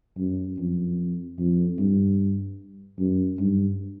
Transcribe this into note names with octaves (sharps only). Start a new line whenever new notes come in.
F#2
F2
F2
G2
F#2
G2